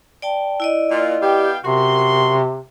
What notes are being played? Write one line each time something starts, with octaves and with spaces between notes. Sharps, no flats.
D5 G5 A5
E4 D5 D#5
A#2 F4
B3 G4 F5 G5
F#2 C3 F#4 A#4 C6